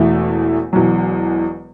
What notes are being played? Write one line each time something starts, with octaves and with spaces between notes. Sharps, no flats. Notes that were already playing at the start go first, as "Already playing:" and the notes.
Already playing: E1 E2 E3 A3 E4
E1 E2 B2 F#3